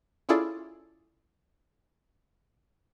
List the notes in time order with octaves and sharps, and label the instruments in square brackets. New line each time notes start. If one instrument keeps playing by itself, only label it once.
[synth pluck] C#4 E4 F4 G#4 A4 D5